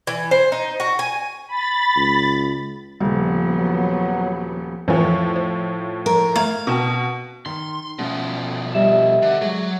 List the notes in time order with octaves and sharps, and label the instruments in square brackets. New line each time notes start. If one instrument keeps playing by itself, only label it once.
[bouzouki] E3
C5
D#4
F#4
G#5
[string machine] B5 A6
[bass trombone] C#2
[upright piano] D#1 [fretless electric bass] C#3 G3 [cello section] F3 B3
[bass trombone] F#3
[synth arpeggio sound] F2 E3 [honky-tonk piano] A2 F3
[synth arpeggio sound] C5
[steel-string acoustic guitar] A#4
[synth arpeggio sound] A3 A#5 G#6 [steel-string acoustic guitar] F5
[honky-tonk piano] B2 [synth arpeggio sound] C4 A5 C#6
[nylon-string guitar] D#3 [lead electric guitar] C6
[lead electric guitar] B2 F3 [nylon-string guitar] A3 C#4
[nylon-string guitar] G3 A#4 D#5 [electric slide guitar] E5
[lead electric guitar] D3
[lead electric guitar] F#3 [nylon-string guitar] G#3